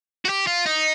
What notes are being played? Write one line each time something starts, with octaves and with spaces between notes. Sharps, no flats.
F#4
G4
F4
D#4